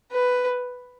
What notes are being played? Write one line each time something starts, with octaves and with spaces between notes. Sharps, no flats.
B4